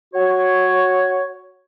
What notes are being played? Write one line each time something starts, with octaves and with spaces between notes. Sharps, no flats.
F#4 C#5